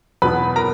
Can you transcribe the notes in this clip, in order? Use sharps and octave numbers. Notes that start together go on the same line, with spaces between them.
E2 B2 F#3 B3 B4 B5
A#4 A#5